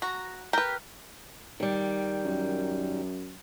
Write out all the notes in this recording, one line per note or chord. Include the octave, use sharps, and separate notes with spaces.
F#4 A#5
G4 A#4 B4
D#3 G3
F#2